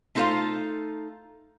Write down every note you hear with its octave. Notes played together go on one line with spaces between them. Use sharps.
A3 D#4 F4 A4 C5 F5